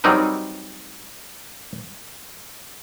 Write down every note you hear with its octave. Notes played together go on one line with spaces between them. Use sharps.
F#3 G3 C4 D#4 A#4 B4